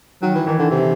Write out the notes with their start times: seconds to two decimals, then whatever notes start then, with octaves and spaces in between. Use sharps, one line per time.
0.22 D#3 F#3
0.34 E3
0.46 D#3 E3
0.59 D3
0.71 C3 E3